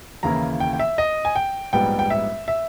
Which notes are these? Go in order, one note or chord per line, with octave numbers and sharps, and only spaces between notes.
D#2 C#3 E3 A#3 E4 A#5
G5
G5
E5
D#5
G#5
G5
A#1 G#2 G3 B3 G5
G5
E5
E5